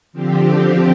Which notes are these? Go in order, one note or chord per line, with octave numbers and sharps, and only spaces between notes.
D3 F3 C4 G4